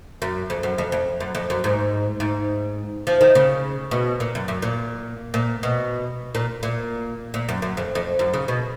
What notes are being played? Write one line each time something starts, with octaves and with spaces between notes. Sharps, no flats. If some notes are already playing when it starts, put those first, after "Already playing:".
F#2
F2
F#2
F2
F2
F#2
F2
F#2
G#2
G#2
F3
D#3
C#3
B2
A#2
F#2
F#2
A#2
A#2
B2
A#2
A#2
A#2
F#2
F#2
F2
F2
F#2
C#3
B2